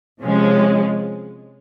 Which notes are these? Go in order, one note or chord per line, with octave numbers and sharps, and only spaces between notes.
C3 F3 G#3 C#4